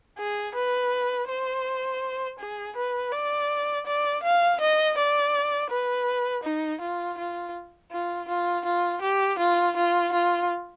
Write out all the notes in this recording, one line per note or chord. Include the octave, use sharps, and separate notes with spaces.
G#4
B4
C5
G#4
B4
D5
D5
F5
D#5
D5
B4
D#4
F4
F4
F4
F4
F4
G4
F4
F4
F4